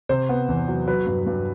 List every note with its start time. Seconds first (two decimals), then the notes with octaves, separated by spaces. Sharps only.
0.09 C3 C5
0.29 B3
0.49 E2
0.68 F#3
0.87 F#3 B4
1.06 G2
1.27 G2